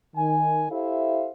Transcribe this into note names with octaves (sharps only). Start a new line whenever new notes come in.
D#3 G#5
E4 G4 A4 C5 E5 F5